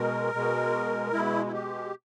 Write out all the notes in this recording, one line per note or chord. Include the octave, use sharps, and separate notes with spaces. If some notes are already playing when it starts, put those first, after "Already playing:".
Already playing: B2 G#3 A#4
B2 G#3
B2 G#3 E4
E4
G4